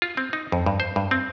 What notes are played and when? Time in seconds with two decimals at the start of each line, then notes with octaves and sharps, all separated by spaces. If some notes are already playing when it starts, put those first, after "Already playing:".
0.02 F4
0.17 C4
0.33 D#4
0.52 F2
0.66 G2
0.80 C5
0.96 G2
1.11 C4